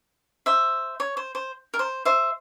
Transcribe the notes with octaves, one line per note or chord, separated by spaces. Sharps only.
C5 E5
C#5
C5
C5
A#4
C5
C5 E5